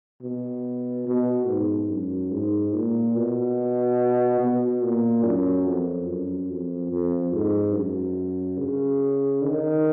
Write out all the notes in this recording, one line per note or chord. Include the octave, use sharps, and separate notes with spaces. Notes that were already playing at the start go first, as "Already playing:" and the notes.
B2
B2
G#2
F#2
G#2
A#2
B2
B2
A#2
F#2
F2
F#2
F2
F2
G#2
F#2
C#3
D#3